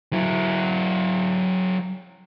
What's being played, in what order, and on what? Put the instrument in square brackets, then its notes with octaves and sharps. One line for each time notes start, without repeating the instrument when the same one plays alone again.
[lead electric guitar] F#3 E4